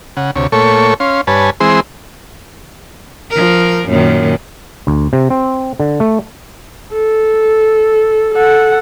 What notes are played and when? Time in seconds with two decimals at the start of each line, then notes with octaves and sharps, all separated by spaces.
0.17 C#3 F#5
0.36 D2 C3 C#5
0.52 A#2 A3 A4 C#5 C#6
1.00 C#4 F5 C6
1.27 G2 B4 C#5 G#5 A5
1.60 E3 G#3 C4 G#4 C6 E6
3.31 F3 A#4
3.88 F#2 A#2 D#3
4.87 D2
5.13 C3
5.30 C4
5.80 D3
6.00 A3
6.93 A4
8.34 A4 F#5